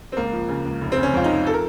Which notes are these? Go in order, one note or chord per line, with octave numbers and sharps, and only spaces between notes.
C4
C#2 A#3
F3
C#3
C#2
F1
C4
C#3
C#4
F2 F4
D#4
F3
A4
A#4